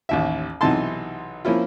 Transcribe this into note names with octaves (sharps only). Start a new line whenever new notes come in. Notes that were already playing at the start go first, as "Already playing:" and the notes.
A1 D#2 E5
B1 C3 E3 D#4 A5 C6
F3 A#3 C#4 E4 F4